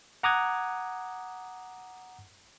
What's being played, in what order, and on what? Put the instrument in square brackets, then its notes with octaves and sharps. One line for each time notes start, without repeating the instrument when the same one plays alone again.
[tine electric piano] F#5 A#5 D6 D#6 F#6 G#6